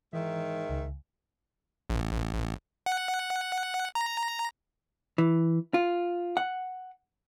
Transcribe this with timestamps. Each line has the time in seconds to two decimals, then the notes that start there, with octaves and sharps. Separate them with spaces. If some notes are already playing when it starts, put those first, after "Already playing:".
0.13 G#2 D#3 E3 E5
0.70 C#2
1.90 A1
2.86 F#5
3.95 A#5
5.18 E3
5.74 F4
6.37 F#5